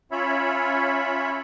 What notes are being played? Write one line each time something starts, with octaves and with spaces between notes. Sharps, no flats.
C#4 F4 C#5 E5 B5